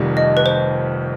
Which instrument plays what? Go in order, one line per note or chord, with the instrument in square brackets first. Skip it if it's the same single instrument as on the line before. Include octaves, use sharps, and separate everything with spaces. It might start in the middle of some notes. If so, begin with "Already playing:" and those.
Already playing: [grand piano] F1 F2 C3 D#3 G3
[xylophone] D#5
B4
C5